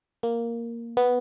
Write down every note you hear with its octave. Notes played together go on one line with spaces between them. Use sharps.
A#3
B3